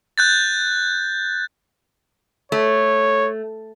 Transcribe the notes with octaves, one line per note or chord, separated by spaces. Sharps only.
F#6 G6 A6
A3 C#5